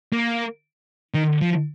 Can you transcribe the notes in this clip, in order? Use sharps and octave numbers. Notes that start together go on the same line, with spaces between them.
A#3
D#3
F3